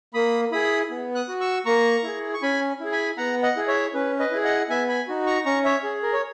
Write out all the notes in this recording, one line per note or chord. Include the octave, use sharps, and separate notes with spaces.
A#3 B5 D#6
E4 G#4 B5 D#6
B3
D#6 F#6
F#4
C#6 E6
A#3 A#5 C#6
E4 G#4
C#6
C#4 G#5 B5
E4 G#4
G#5 B5
B3 F#5 A#5
D#5 F#5
E4 G#4
C#5 E5
C#4 B4
B4 D#5
E4 G#4
D#5 F#5
B3 E5 G#5
G#5 B5
D#4 F#4
A#5 C#6
C#4 A#5 C#6
C#5 E5
G#4
A#4
C#5